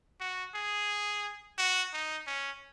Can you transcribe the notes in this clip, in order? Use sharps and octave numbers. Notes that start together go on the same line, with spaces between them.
F#4
G#4
F#4
D#4
C#4